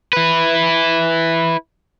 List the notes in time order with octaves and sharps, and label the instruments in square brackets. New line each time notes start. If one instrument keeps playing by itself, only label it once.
[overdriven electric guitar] E4 B4